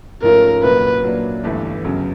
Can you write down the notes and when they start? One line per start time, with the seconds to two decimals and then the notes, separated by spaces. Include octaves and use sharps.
0.22 G#2 F3 A3 C#4 F4 A#4
0.63 C2 A#2 F#3 B4
1.03 A#2 F#3 A#3 D4
1.43 G1 G2 E3 A3
1.84 G1 F#2 C#3 F#3